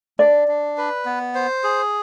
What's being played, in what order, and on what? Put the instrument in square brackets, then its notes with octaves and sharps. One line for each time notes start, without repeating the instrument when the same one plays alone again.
[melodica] D4 [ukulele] D5
[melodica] D4
B4
B3
C5
G#4